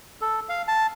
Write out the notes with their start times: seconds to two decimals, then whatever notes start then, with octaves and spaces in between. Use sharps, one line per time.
0.21 A4
0.49 F5
0.68 A5